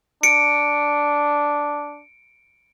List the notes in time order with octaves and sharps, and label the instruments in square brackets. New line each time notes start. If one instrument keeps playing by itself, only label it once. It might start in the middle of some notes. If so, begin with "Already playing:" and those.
[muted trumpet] D4 [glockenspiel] C#7 D7